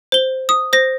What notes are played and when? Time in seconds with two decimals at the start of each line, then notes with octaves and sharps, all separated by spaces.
0.12 C5 G7
0.49 D#6
0.73 C5 A#6